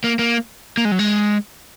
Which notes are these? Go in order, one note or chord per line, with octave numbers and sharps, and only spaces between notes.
A#3
A#3
A#3
G#3
F#3
G#3